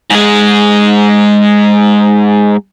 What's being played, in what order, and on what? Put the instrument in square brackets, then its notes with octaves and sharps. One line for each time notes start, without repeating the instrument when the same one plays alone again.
[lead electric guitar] G#2 G#3